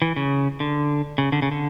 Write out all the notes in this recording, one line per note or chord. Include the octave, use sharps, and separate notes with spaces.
E3
C#3
D3
C#3
D3
C#3
D3